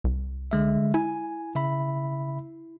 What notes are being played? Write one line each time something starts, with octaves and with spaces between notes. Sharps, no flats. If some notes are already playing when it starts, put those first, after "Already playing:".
C2
D3 G#3 E5
E4 G#5
C#3 E5 B5